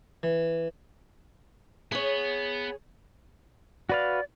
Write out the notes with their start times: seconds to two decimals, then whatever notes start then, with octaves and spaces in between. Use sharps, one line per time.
0.23 E3
1.92 B3 G#4 C#5
3.89 F#4 B4 D5 F5